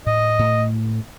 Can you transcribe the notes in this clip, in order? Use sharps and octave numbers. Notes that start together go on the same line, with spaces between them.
A2 D#5
A2